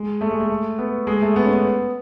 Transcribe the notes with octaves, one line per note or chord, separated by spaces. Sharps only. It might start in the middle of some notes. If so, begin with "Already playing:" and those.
Already playing: G#3
A3
G#3
A3
B3
G#3
A3
B3
C#4
B3